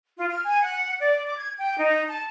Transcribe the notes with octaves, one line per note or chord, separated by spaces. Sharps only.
F4
F6
G#5
F#5
D5
D6
G#6
G5
D#4
A5